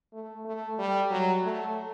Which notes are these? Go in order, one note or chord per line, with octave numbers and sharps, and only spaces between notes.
A3
A3
G3
F#3
A3